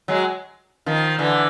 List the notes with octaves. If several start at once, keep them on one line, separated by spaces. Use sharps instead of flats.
F#3 G#3
D#3 F3
D3 E3